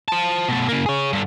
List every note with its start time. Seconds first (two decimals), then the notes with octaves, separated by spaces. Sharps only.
0.08 C5 A5
0.48 B2 A3
0.69 C#3 A#3
0.86 G#4 C#5
1.13 G2 D3